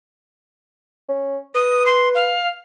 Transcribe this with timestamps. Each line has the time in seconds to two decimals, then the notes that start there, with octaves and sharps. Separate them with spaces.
1.09 C#4
1.55 B4 D#6
1.86 C6
2.15 F5